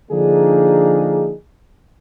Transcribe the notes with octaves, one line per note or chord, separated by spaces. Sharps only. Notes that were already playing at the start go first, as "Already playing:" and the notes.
D3 F3 A#3 D4 D#4 G#4